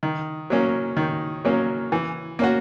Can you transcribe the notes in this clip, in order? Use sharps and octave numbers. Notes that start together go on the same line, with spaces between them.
D#3
F#3 A#3 C#4
D#3
F#3 A#3 C#4
E3
A#3 C#4 F#4